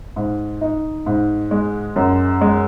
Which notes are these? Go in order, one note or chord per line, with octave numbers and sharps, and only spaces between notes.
G#2
D#4
G#2
G#3
F#2
G#3